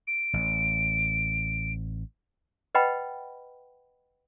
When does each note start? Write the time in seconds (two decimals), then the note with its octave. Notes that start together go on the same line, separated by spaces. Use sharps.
0.07 D7
0.33 A1
2.75 B4 D#5 F#5 G5 B5